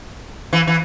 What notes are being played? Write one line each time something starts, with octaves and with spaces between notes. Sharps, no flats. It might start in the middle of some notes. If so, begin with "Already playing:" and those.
E3
E3